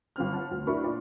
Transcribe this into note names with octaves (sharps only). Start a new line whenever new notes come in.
G1 C4 F6
F#5 A5
D2
D4 E4 F#4 A#4 B5 C#6
A#2 D5